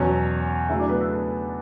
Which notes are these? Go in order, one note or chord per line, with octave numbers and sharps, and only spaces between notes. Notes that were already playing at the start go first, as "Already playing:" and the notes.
Already playing: E2 B2 F#3 C#4 C#5
C#3 F#3 A3 E4 E5
D4 D5
B3 B4
A4